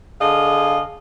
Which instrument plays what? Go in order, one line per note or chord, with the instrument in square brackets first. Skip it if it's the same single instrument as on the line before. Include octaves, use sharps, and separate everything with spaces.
[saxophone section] D3 G#4 D#5 F5